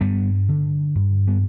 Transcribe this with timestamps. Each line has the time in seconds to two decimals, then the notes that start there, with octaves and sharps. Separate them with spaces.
0.01 G2 G3 B3
0.49 D3
0.95 G2
1.27 G3 B3